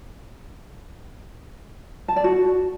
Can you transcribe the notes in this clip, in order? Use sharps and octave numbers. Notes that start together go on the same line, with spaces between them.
A5
D5
F#4